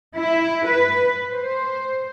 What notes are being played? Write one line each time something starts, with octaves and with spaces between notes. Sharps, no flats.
E4
B4
C5